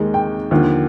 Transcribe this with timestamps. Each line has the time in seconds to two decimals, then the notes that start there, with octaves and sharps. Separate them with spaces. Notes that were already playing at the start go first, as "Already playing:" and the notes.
Already playing: D#2 D#3 G#3
0.14 G5
0.51 D#2 D3 F3